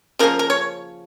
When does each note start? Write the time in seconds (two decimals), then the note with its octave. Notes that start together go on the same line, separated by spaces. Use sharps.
0.19 C#3 F3 A#3 C#4 A#4
0.39 A#4
0.50 C#5